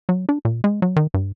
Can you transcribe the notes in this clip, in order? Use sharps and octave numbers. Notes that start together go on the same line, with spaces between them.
F#3
D4
A#2
G#3
F#3
D#3
G2